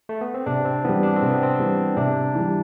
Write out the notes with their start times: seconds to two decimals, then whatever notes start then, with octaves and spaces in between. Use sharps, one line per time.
0.09 A3
0.21 B3
0.34 C4
0.46 C3 D4
0.65 C4
0.84 E3 G3 B3
1.03 D4
1.16 C4
1.22 C3
1.30 B3
1.43 C4
1.59 E3 G3
1.97 C3 D4
2.35 E3 G3